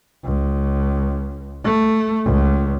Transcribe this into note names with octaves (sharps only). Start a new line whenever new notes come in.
C#2
A3
C#2